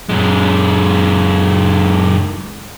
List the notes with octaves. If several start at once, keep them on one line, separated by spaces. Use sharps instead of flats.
F#2 G#3